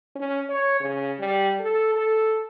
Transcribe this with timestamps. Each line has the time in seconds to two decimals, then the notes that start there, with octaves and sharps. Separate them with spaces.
0.16 C#4
0.49 C#5
0.80 C#3
1.19 G3
1.60 A4
1.94 A4